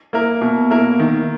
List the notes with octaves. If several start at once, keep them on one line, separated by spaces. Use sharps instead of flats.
A#3 E4 A#4
B2
A#3 E4 A#4
D#3